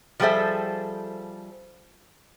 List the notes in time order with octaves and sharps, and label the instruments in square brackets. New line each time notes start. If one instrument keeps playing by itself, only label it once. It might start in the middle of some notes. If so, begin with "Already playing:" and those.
[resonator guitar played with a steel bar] F3 G3 G#4 A4 C5 E5